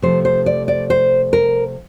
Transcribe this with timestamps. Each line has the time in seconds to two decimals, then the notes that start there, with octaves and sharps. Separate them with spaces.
0.02 C3 F3 A3 C5
0.25 C5
0.46 D5
0.68 D5
0.90 C5
1.33 A#4